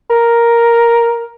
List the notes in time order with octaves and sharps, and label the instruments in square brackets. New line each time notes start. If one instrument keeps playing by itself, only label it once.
[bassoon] A#4